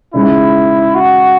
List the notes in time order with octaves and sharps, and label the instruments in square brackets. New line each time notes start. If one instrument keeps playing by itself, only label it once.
[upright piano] C#3 G#3 D#4 [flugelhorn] E4
[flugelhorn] F#4